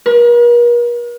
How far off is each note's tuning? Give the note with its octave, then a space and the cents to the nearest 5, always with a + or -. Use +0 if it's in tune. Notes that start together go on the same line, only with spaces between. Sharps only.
A#4 +45